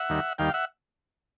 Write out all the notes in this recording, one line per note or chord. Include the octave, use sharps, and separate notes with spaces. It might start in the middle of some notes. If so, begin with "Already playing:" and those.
Already playing: E5 F#5
D#2 D#3 G3
D#2 D#3 G3 F5 G5
E5 F#5